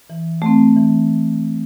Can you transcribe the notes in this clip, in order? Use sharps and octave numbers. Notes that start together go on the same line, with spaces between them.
E3
A3 C4
E3